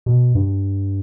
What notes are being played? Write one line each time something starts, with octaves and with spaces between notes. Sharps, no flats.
B2
G2